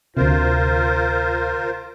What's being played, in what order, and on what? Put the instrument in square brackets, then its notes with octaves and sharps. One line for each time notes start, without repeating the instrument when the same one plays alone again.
[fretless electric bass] D2 C3 [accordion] F4 A#4 C5